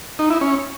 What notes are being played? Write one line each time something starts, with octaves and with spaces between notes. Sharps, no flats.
D#4
E4
C#4